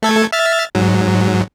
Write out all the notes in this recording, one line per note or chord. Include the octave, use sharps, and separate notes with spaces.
A3 A4 G#6
E5 F6 A6
G#2 F#3